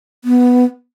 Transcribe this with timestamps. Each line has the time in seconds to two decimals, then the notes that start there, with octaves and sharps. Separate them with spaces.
0.25 B3